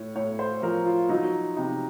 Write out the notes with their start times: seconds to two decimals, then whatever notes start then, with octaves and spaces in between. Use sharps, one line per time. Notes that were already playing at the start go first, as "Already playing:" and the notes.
Already playing: A2 C#5
0.16 A2 C#5
0.39 C5
0.62 F3 A#4
0.85 F4
1.09 F#3 D#4
1.56 C3 D#4